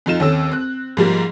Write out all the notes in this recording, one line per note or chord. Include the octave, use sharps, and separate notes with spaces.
F2 D#4 F4 E7
D#2 C4 C#4 A4 E6
C4 F#6
G#2 F3 G3 A#3